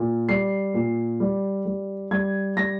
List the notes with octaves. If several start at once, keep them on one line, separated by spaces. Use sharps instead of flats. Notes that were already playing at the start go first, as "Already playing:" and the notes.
Already playing: A#2
G3 C7
A#2
G3
G3
G3 G#6
G3 A#6